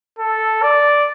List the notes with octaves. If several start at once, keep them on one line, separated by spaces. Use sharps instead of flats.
A4
D5